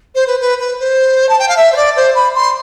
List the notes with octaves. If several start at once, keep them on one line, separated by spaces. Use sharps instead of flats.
C5
B4
B4
B4
C5
A5
G5
F5
E5
C5
D5
C5
B5
C6